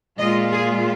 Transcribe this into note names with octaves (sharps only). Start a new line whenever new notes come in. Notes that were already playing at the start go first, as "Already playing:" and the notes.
A#2 G#3 F4 D#5
G#4